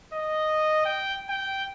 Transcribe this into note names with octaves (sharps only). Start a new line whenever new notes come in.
D#5
G5
G5